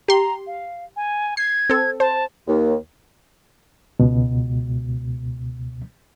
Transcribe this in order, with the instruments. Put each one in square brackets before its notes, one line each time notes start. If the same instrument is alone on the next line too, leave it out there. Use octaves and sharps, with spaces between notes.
[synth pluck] G4 C6 [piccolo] A#5
[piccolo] F5
G#5
[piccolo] G#6 [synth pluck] C7
[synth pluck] C4 A4
[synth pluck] C5 [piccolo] A5
[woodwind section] D#2
[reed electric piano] C#2 B2